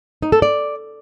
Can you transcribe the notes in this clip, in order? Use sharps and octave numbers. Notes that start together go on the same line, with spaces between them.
D#4
A4
D5